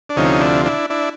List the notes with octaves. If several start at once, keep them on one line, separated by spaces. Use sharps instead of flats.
D4
D2 C3 F3 C#4 D#4
D4 E4
D4 E4
D4 E4